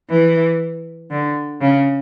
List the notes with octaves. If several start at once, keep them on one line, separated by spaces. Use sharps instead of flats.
E3
D3
C#3